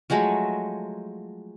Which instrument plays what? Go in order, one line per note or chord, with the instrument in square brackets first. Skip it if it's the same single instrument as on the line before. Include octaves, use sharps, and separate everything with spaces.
[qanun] F3 F#3 G#3 A3